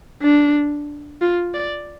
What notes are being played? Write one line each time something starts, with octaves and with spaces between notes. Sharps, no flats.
D4
F4
D5